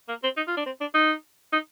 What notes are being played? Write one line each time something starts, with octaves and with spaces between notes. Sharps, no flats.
A#3
C4
D#4
F4
D4
C4
D4
D#4
D#4